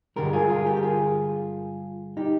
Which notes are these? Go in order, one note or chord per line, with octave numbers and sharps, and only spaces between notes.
G2 D3 G#3 G4 A#4
F4 G#4
F4 G#4
G4 A#4
G4
F4 G#4
D#4 G4